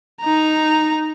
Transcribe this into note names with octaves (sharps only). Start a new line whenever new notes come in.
D#4 A#5